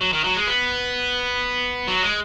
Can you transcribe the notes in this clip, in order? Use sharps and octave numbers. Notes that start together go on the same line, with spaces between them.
F#3
D#3
F#3
G#3
B3
F#3
G#3